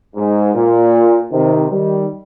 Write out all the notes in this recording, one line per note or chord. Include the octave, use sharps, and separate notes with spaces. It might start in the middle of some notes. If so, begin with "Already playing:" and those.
G#2
A#2
C3 D#3
D#3 G3